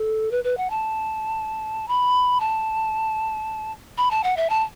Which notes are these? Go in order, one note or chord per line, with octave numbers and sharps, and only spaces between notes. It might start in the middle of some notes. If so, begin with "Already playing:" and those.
Already playing: A4
B4
B4
F#5
A5
B5
A5
B5
A5
F#5
E5
A5